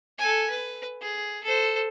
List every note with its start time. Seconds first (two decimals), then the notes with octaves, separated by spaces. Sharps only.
0.18 A4 G#5
0.49 B4
1.01 G#4
1.43 A4 C5